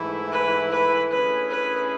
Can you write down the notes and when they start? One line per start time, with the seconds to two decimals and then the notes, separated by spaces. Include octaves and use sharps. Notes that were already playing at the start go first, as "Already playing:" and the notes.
Already playing: G#2 E3 A3 E4
0.32 B4
0.71 B4
1.11 D3 A3 C#4 E4 G#4 B4
1.50 B4